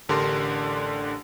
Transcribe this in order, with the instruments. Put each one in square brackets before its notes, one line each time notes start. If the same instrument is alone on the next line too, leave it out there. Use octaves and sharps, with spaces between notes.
[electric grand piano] A1 D3 D4 G4 A#4 C6